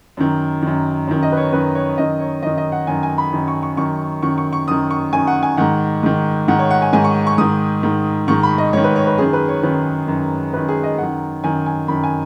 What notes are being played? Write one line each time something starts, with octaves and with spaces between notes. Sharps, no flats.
F#2 D#3
F#2 D#3
F#2 D#3
D#5
B4
C#5
F#2 D#3 B4
C#5
F#2 D#3 D#5
C#5
F#2 D#3 D#5
D#5
F#5
F#2 D#3 G#5
G#5
B5
F#2 D#3
C#6
C#6
F#2 D#3 C#6
F#2 D#3 C#6
C#6
C#6
F#2 D#3 D#6
C#6
F#2 D#3 G#5
F#5
G#5
G#2 D#3 F#5
G#2 D#3
G#2 D#3 F#5
C#5
F#5
G#5
G#2 D#3 G#5
C#6
C#6
G#2 D#3 D#6
G#2 D#3
G#2 D#3 C#6
B5
D#5
G#2 D#3 C#5
B4
C#5
B4
F#2 D#3 G#4
B4
C#5
F#2 D#3 B4
F#2 D#3
F#2 D#3 B4
G#4
D#5
F#2 D#3 F#5
F#2 D#3 G#5
G#5
F#2 D#3 B5
G#5